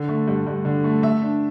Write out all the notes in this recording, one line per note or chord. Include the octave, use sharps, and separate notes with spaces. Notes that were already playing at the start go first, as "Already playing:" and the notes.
Already playing: D3
A3
G2
G2
D3
A3
A3 E5
D4